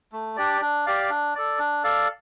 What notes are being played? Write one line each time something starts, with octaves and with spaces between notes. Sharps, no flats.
A3
D4 G4 D5
D4
G4 D5 F5
D4
A4 D5
D4
A4 D5 F5